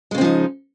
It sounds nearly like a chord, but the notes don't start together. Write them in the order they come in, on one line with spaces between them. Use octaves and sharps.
G#3 C#3 C4 F3 D#4